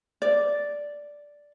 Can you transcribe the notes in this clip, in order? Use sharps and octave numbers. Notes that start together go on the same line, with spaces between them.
D5